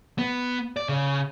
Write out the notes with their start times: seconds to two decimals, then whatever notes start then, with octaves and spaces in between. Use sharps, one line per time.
0.19 B3
0.77 D5
0.89 C#3